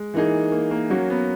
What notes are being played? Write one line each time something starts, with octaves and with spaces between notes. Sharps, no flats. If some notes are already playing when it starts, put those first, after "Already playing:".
Already playing: G#3
E3 A#3 D#4 G#4
A#3
A#3
F#3 A#3 C#4 F#4
B3